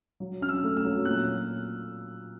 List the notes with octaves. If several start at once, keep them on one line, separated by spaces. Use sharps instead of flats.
F#3
C#4 F6
E6
A3
E6
F#3
A#2 F#6